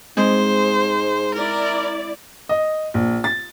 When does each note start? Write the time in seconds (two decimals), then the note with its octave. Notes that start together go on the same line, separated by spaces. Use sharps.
0.17 G#2 G#3 C4 C5
1.34 E4 A#4 D5
2.49 D#5
2.94 A#1
3.24 A6